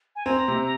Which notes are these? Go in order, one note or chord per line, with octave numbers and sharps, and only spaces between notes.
G#5
C4 A#5
C3